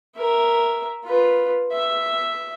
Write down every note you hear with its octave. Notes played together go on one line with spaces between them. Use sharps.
A#4 E5
F4 B4
E5